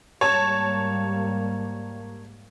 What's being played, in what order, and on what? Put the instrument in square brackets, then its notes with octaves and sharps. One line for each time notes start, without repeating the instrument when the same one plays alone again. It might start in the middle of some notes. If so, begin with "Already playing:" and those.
[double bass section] G#2 G3 A#3 [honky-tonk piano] C#5 A5